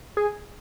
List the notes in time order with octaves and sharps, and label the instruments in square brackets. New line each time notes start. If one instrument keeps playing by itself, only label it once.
[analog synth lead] G#4